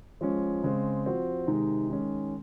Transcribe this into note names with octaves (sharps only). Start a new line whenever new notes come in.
F3 G#3 C#4
C#3 G#3 C4
F3 C4 F#4
C3 D#3 G#3 D#4
D#3 G#3 C#4